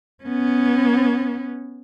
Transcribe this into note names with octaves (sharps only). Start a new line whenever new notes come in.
B3 C#4